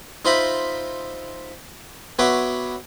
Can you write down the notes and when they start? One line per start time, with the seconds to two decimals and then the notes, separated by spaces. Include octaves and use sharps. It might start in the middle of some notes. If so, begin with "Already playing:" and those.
0.25 D#4 F4 C5 E5 A#5 B5
2.19 B3 F#4 C#5 E5 C6 D6